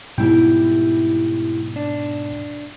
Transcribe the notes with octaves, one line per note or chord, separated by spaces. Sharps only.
G#2 B2 G3 E4 G4 G5
D4